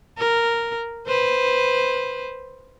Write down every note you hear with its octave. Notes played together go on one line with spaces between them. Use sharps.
A#4
B4 C5